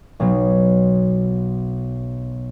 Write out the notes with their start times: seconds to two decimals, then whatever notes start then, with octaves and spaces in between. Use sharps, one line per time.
0.20 B1 B2 F#3